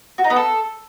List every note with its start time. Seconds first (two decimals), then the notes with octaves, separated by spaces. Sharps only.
0.18 F#4
0.24 D#4
0.30 B3
0.36 A4